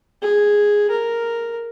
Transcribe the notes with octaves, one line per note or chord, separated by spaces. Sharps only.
G#4
A#4